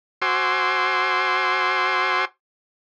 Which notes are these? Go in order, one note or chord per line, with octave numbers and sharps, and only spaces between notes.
F#4 C5 G#5 C6 D6 E6